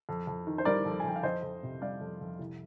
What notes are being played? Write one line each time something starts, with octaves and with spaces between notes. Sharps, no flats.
F2
F2
D#3
C5
G3 A#4 D5
F2
G#5
F2 G5
F5
F2 C5 D#5
F2
C3
G3 D5 F5
F2
F2
C2